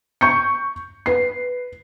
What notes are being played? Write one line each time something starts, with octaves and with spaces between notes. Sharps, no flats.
C#6 G6 C#7
B4 C7